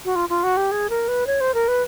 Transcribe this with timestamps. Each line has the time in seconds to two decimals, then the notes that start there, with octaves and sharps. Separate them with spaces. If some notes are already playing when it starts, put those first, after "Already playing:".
0.05 F#4
0.15 F4
0.29 F4
0.43 F#4
0.57 G4
0.72 G#4
0.90 A#4
1.08 B4
1.27 C#5
1.41 C5
1.54 A#4
1.68 B4